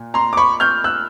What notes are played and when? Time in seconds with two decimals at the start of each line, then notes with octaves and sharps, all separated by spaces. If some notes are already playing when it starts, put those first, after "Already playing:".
Already playing: A#2
0.14 A#5 C6
0.33 D6
0.37 B5 C#6
0.60 F6 G6
0.84 E6 F#6